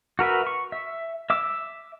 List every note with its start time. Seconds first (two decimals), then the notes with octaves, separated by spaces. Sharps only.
0.19 F#4 A#4 B4 E5
0.47 C#6
0.72 E5
1.30 E5 D6 E6